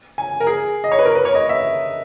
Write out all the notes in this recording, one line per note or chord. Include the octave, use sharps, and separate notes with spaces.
G#5
A#4
G#4
D#5
C#5
B4
A#4
B4
C#5
D#5
E5